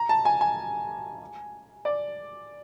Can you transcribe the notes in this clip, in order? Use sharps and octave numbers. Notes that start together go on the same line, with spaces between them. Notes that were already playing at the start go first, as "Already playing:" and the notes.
Already playing: A#5
A5
G#5
G#5
D5